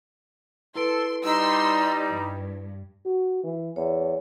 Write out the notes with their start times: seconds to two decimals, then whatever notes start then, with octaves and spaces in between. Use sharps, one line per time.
0.75 E4 A4 B4 C6 D7
1.24 G3 D#4 C6 E6
2.09 G2
3.05 F#4
3.43 E3
3.76 E2 C#5